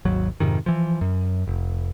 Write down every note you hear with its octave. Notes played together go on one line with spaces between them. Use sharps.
G#1 D#2 F#3
F2 G#2 C3 D#3
E3 F3
F#2
F1